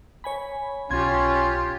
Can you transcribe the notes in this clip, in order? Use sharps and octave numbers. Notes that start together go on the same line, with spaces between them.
C#5 G#5 B5
B1 C#4 F4 G4 C6 G#6